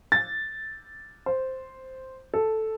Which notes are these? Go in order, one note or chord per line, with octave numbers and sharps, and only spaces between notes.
A6
C5
A4